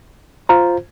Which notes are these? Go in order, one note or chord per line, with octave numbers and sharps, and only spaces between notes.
F4 C5 A#5